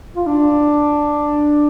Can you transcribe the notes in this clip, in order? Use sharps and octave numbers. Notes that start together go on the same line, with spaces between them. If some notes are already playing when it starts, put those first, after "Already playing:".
F4
D4